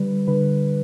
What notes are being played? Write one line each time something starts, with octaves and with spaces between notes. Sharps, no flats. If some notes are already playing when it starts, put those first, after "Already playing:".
Already playing: D3 G3 B4
D3 B4